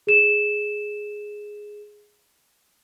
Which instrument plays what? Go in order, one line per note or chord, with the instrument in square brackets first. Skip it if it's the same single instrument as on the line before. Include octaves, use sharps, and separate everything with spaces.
[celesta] G#4 E7